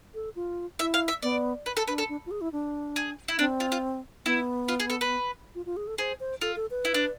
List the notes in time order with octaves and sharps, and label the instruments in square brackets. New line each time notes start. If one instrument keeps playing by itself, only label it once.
[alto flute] A4
F4
[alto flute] E4 [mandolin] E5
[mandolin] F5
E5
[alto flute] B3 [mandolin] D5
[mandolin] B4
A4
[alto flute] D4 [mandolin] B4
[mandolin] A4
[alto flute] D4
F4
G#4
E4
D4
[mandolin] G#4
E4
[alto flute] C4 [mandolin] D4
[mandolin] F4
F4
[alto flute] B3 [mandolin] E4
[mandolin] F4
G#4
A4
B4
[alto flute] F4
F4
G#4
A4
[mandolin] G#4 [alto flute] C5
[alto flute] C5
[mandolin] F4 [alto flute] A4
[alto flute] A4
B4
[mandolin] E4
D4